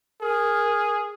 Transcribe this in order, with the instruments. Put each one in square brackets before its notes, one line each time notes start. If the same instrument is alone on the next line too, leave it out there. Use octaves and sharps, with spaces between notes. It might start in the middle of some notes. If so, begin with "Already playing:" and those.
[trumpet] G#4 [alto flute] A#4